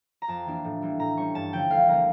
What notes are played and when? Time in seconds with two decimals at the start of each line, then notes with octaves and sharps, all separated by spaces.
0.22 A#5
0.28 F2 A5
0.46 E3 A#3 D4
0.64 A2
0.82 E3 G3 A#3
0.99 A2 A#5
1.17 G3 C#4 C#6
1.35 G2 A5
1.52 D3 F3 A3 C#4 G5
1.70 D2 F5
1.88 D3 G3 A#3 A#4